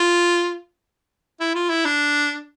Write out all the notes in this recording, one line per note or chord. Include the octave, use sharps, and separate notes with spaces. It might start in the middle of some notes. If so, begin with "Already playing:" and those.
Already playing: F4
E4
F4
E4
D4